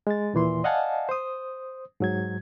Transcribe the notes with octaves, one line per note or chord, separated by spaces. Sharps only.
G#3 A6
D#2 A#2 E3 C6
D5 D#5 F5 F#5 G#5 A5
C5 D#6
G#2 F#3 G#6